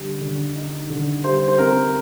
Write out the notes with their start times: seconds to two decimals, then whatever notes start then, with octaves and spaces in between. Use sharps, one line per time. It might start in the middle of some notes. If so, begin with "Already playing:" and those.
Already playing: D3 G3
0.21 D3
0.55 D#4
0.89 D3
1.24 G3 C5
1.48 C5
1.58 C4 A#4